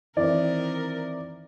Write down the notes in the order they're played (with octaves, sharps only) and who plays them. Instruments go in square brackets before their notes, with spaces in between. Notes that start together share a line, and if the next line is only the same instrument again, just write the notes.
[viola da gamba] D#3 A#4 [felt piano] E3 C4 [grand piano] D5